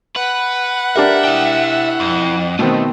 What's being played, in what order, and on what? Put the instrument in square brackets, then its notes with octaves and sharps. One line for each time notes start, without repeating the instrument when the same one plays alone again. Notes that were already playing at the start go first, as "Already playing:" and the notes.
[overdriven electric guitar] B4 [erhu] F#5
[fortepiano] D4 G4 A#4 [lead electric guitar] E5
[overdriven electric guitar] E4 G5
[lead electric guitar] F2
[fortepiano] B2 D#3 C4 [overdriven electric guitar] A3